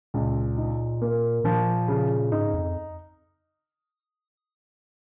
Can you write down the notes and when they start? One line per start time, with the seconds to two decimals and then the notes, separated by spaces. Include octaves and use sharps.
0.14 C#2 A#2
0.58 D#4
1.02 A#3
1.44 A#2 F3
1.88 C#3
2.32 G#2 D#4
2.54 F2